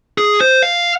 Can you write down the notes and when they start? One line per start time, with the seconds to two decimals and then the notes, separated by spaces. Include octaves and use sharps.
0.18 G#4
0.41 C5
0.63 F5